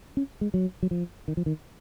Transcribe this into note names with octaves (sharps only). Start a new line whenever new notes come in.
C#4
G#3
F#3
F#3
F3
D#3
F3
D#3